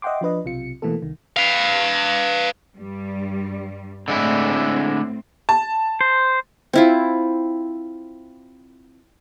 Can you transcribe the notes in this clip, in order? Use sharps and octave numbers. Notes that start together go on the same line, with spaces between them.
D#5 E5 F#5 G5 C6 D6
F3 D4 B4 D#5
B1 C3 F4 C#7
B2 E3 A3 A#3 A4
C2 D#3
B4 F5
G2 G3
A2 D3 G#3 C4 E4
A5
C5
C4 E4 F4